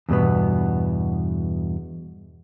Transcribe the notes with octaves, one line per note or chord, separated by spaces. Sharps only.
E2 G2 B2 B3